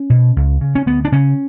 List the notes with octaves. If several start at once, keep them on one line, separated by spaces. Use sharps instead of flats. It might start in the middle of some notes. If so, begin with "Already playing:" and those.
Already playing: C#4
B2
C#2
C#3
C#4
D2 B3
D4
C#3 C#4